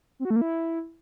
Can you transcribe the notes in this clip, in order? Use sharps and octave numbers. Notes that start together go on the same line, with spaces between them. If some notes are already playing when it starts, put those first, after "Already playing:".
C4
F#4
A3
A#3
E4